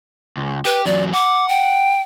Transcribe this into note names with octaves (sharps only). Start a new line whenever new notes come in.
C#2
G4 B4
E2 F#3 D5
F#5 D6
G5